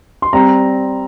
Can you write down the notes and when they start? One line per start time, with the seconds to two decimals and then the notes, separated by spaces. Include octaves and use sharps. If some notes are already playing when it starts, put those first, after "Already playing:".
0.22 C6
0.33 G3 C4 A#5